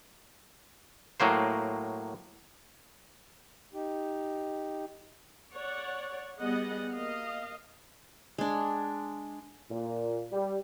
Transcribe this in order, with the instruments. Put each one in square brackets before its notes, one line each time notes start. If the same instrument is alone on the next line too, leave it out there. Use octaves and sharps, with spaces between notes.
[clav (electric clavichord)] A2 F#3 A#3 C5
[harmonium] D#4 G4
[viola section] C#5 D5 F#5
G3 B3 G#4 D#5 F#5
A#3 D#5 F5
[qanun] G#3 D4
[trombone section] A#2
G3